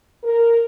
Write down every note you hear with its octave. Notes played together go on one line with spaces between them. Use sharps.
A#4